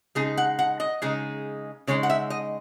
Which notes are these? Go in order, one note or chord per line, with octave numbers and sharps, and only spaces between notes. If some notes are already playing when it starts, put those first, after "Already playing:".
C#3 G#3 D#4 G#4
F#5
F#5
D#5
C#3 G#3 D#4
C#3 G#3 D#4 C#5
F#5
E5
D#5